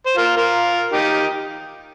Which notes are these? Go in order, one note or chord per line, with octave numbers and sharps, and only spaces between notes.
C5
F4 A#4
F4 A#4
D#4 G4